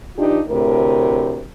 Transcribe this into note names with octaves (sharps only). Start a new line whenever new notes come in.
E3 D4 D#4 F4 G4
D2 A2 C3 A#4